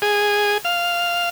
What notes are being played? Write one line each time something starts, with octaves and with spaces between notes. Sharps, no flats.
G#4
F5